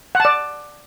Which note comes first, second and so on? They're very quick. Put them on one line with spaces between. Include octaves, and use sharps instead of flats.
F#5 A5 D5